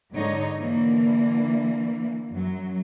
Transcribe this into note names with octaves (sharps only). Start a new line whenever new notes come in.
G#2 D3 D#4 C#5
D3 E3 A#3
F#2 F#3